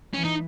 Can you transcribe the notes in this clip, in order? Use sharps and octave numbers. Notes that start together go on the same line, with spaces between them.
E3 C#4
D#4